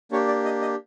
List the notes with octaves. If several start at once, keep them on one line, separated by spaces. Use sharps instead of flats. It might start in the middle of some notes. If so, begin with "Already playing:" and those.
A#3 D4 G4 C#5
D5
D#5
D#5